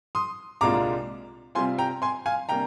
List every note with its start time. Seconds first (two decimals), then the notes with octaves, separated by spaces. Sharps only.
0.15 C6 D#6
0.61 C2 A#2 G#3 D4 F4 A#5 D6
1.55 C3 G3 C4 F4 G#5 C6
1.78 G5 A#5
2.02 G#5 C6
2.26 F5 G#5
2.49 C3 G3 A#3 D4 G5 A#5